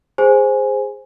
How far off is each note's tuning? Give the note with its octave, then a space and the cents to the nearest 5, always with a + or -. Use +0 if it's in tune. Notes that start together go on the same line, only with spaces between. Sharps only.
G#4 -10 C5 +0 G#5 +0